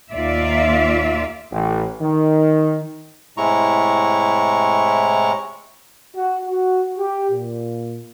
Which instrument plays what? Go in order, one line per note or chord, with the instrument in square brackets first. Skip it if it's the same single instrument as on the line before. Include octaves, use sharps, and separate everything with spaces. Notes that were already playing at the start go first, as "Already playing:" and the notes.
[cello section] D#2 F4 D5 E5
[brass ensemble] A1
D#3
[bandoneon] A2 C3 G#3 E4 A#5 C#6
[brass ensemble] F#4
F#4
G4
A#2